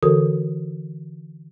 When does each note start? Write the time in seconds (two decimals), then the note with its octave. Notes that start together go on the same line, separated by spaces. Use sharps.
0.03 D3 E3 F#4 A4 A#4 D#6